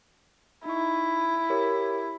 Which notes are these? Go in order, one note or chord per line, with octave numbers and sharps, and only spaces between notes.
D#4 E4 C#6
G4 A#4 C#5